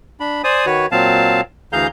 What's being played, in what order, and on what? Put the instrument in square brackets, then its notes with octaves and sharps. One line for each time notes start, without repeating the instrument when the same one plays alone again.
[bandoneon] D4 B5
C5 D5 G#5 D#6
D#3 F#4 B4 C#5
A#2 F#3 C4 F5 A5
D2 E3 G#4 F5 A#5 G6